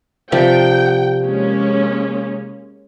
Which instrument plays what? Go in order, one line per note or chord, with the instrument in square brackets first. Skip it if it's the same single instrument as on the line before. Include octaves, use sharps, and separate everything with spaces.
[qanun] C3 F3 G3 [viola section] G5
[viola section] G#3 A#3 C#4